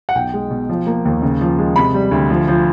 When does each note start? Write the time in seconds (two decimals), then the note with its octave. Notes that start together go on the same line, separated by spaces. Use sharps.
0.09 F#5
0.15 B1 G5
0.34 G#3
0.51 B2
0.69 F3
0.87 A#3
1.05 D#2
1.22 C#3
1.41 F3
1.59 G#3
1.76 C3 B5
1.94 G3
2.11 D2
2.30 F3
2.48 F3